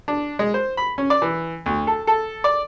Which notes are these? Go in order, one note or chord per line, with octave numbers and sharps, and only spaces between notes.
D4
G#3
C5
B5
C#4
D5
E3
D2
A4
A4
D5